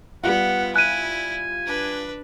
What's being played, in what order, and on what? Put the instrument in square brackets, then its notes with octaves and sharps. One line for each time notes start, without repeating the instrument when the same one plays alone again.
[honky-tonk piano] G3 F4 [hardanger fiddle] B3 [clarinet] F#5
[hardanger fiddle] E4 [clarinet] G#5 [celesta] F#6 D#7
[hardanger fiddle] D4 B4